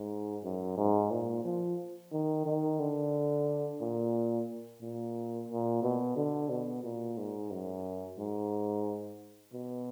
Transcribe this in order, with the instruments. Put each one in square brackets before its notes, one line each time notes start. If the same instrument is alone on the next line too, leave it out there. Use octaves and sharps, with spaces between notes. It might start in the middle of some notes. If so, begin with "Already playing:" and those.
Already playing: [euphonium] G#2
F#2
G#2
A#2
F3
D#3
D#3
D3
A#2
A#2
A#2
B2
D3
B2
A#2
G#2
F#2
G#2
B2